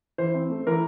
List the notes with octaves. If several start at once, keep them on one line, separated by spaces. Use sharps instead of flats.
E3 C5
C4
A3
E3 A#4